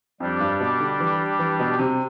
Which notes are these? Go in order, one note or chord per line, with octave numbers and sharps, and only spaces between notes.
F2 G3 D4 G4
G2
B2
D3
E3
E3
B2
C3